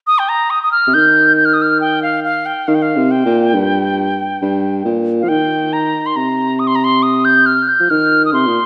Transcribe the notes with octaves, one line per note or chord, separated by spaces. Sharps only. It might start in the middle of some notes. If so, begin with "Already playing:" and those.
D#6
G5
A#5
D#6
D#6
F6
C3
D#3 G6
G6
F6
D#6
F6
G5
F5
F5
G5
D#3 F5
G5
F5
C3
G5
A#2
G2
G2
A#2
F3 F5
D#3 G5
A#5
C6
C3 A#5
D#6
C6
A#5
C6
D#6
G6
F6
G6
F3
D#3 F6
D#6
C3 C6
A#2